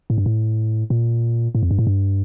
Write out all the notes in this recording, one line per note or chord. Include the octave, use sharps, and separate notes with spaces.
A2
G2
A2
A#2
A2
F2
G2
A2
G2